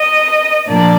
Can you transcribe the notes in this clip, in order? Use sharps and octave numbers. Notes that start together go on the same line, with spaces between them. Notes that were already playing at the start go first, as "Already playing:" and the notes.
Already playing: D#5
A#2 F3 A#3 D4 D5